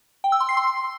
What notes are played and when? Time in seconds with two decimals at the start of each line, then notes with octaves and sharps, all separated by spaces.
0.24 G5
0.32 E6
0.40 C6
0.49 C7
0.57 C6